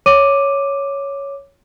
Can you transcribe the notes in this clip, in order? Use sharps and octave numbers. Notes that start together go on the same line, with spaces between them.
C#5 D6 D#7